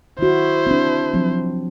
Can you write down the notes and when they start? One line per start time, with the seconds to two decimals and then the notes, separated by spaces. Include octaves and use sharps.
0.19 D#3 E4 F#4 C5
0.67 C4 D4
1.14 F3 F#3 C4